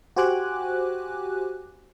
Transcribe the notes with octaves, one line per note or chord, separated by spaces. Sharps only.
F#4 G4 C5 G#5 D6 F#6